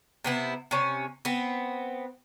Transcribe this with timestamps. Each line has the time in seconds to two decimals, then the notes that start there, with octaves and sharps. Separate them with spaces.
0.24 C3 B3 E4
0.71 C3 C#4
1.25 B3 C4